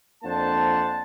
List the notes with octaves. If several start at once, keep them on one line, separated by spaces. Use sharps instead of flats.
F2 A#3 D4 C5 F#5 A5